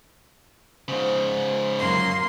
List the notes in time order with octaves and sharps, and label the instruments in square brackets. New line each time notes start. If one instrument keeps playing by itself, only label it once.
[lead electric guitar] G#2 C#3 [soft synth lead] C5
[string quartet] F#2 A#3 C6